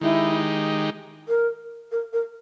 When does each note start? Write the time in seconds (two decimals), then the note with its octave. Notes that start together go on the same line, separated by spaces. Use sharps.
0.01 D#3 G#3 D#4 E4 G4
1.28 A#4
1.92 A#4
2.13 A#4